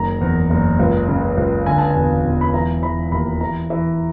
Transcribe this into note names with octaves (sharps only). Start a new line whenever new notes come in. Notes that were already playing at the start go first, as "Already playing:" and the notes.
Already playing: F#1 D#3 A#5
E2
F#1
C#2
C#3
C#2
D3 G#5
A5
G#5
E1
E1
B5
E3 A#5
E3 B5
D#2 B5
E3 A#5
E3